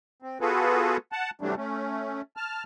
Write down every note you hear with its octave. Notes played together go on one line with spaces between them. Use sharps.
C4
B3 F4 F#4 G#4 A4 B4
F#5 A5
C3 E3 F#3 G3 A3 D4
A3 C#4
A5 F6